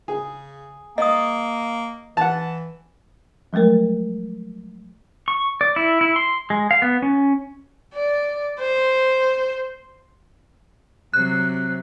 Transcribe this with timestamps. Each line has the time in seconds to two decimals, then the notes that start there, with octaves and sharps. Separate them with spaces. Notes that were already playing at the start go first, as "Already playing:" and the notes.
0.08 C#3 G#4
0.98 A#3 D#5 D#6
2.17 E3 F#5 A5
3.53 F3 F#3 G#3 A3 A#4
5.28 C#6
5.61 D5
5.76 E4
6.01 E4
6.16 C6
6.50 G#3
6.71 F5
6.82 B3
7.02 C#4
7.94 D5
8.60 C5
11.13 C3 F#3 F#6